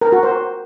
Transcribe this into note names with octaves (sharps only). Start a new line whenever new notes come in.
A#4
F#4
C5